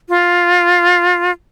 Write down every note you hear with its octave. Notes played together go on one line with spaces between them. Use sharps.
F4